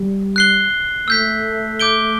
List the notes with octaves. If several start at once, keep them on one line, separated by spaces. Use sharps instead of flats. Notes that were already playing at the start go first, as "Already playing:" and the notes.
Already playing: G3
F#6 C7 G7
A3 E6 G6 B6
D6 G6 D7 G7